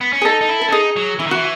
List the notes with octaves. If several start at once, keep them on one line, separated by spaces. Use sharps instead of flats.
B3
C#4
G#4
D#4 A4
D#4
E4
A4
C#4
D#4 G#4
F#3
E3 E4
D#3
E3 F#4